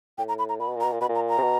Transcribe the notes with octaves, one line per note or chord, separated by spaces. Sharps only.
A2 G5
A#5
B5
A#5
A#2 B5
B2
A#2
A#5
B2
A#2
B2 B5
A#2
A#5
A#5
C3
B2